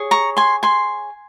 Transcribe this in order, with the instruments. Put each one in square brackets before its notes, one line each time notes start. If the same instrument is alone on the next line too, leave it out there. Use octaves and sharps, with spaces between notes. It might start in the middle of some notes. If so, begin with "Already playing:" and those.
Already playing: [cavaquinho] G#4 C#5
A#5 C#6
G#5 C6
G#5 C6